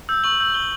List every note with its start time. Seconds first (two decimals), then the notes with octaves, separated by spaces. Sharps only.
0.09 E6 G6
0.24 C#6 F#7
0.40 E6 G6
0.54 C#6 G7